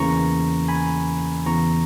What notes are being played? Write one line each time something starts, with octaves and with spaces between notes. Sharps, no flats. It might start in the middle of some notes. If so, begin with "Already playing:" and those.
Already playing: E2 C#3 E3 A#3 C#4 A#5 C#6
G#5 B5
E2 C#3 E3 B3 A#5 C#6